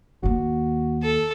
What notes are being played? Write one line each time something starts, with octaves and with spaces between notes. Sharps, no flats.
D#2 A#3 F#4
A4